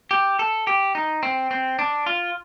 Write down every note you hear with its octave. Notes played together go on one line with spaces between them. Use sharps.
G4
A4
G4
D#4
C4
C4
D4
F4